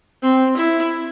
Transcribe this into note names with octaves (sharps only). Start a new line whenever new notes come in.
C4
E4